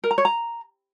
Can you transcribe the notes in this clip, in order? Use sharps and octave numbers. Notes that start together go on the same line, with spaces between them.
A#4
A#5
C#5
A#5